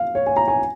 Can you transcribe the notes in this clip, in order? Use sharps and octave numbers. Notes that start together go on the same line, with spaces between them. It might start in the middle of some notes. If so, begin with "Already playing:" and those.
Already playing: F5
C#5
G#5
A#5
G#5